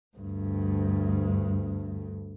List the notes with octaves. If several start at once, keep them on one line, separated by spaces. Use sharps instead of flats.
D2 G2